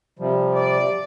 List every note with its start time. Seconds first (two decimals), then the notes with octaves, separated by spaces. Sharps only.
0.19 C3 F3 G3
0.57 D5